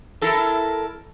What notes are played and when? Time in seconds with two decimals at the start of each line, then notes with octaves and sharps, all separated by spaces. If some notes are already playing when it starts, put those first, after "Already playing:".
0.21 E4 A4 A#4